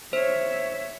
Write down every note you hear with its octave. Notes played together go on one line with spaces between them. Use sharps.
C5 C#5 E5